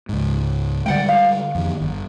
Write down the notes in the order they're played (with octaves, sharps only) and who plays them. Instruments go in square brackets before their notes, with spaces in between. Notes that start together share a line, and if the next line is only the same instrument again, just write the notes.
[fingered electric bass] C#2 G#2
[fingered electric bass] D3 G3 G#3 [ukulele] D5 F#5 G5
[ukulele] F5
[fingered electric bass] F2 D#3
G1